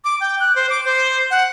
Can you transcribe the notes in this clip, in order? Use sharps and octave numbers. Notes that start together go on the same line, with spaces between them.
D6
G5
F#6
C5
D6
C5
F#5